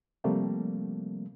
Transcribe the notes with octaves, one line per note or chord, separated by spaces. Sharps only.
C3 F3 G3 A3 A#3 C4